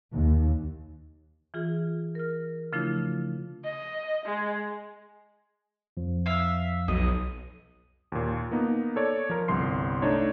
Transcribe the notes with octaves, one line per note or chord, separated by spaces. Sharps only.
D#2
E3 F4 G#4
A#4 F6
C#3 F3 A3 D4 E4 F4
D#5
G#3
F2 F3
E5 F5
B1 D#5
D#2 A#2
A#3 B3 D#4
A4 C#5 D5
F3 A#4
G1 C2 C6 C7
A3 D4 D#4 C#5